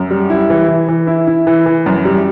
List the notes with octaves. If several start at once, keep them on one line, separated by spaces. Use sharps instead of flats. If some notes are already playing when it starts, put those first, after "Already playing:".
Already playing: F#2
G3
E4
E3
E3
E3
E4
E4
E3
E3
F#2
G3